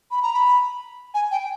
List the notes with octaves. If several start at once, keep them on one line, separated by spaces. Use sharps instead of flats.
B5
A#5
B5
G#5
G5